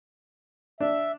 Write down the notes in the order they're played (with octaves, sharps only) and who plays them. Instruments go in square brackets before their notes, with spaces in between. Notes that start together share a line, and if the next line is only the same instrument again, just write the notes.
[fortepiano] D4 [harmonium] E5